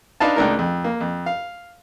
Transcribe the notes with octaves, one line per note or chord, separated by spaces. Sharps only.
D4 D#4 B4 F5 A5
C#2 A2 D4 D#4 A#4
F2
A#3
F2
F5